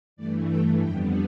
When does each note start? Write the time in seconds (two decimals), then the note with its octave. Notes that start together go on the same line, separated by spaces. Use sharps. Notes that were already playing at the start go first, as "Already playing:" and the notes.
0.16 G2 E3 A3 D5
0.49 G5
0.80 F2 D3 G3 B3 G5